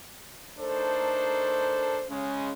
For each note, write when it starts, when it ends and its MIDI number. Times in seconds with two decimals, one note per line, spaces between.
0.59 2.02 57
0.59 2.02 62
0.59 2.02 63
0.59 2.02 69
0.59 2.02 70
0.59 2.02 72
2.09 2.51 49
2.09 2.51 56
2.09 2.51 61